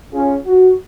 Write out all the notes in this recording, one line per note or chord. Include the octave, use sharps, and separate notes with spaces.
C#4 F4 G#4
F#4